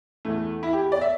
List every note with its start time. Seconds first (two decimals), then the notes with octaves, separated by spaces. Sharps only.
0.25 E2 E3 A3
0.63 E4
0.73 G4
0.92 D5
1.01 E5